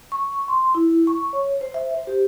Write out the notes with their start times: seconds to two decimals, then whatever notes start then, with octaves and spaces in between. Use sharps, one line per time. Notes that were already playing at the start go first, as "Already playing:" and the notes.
0.12 C#6
0.48 C6
0.75 E4
1.07 C#6
1.33 C#5
1.61 C5
1.74 E5
1.94 C5
2.07 G4